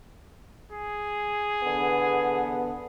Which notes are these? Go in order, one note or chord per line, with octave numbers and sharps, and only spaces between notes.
G#4
E2 D3 B3